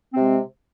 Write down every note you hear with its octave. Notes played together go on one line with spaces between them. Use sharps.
C3 G#3 C4